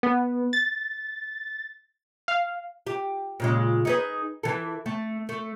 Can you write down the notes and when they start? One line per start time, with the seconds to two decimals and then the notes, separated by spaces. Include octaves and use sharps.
0.03 B3
0.53 A6
2.28 F5
2.87 G4
3.40 A#2 C#3 G#3
3.85 D#4 G#4 B4
4.43 E3 A4
4.86 A3
5.29 A3